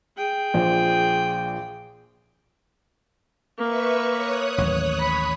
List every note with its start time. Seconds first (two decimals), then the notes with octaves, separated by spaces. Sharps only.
0.17 G#4 G5
0.54 A#1 A#2 C5
3.58 A#3 B4 E5 C#6
4.09 C#5 D#6 F#6
4.58 A1 D#2 F#3
4.98 B5